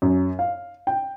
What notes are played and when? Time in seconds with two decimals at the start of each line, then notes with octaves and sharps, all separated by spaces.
0.02 F#2
0.39 F5
0.87 G5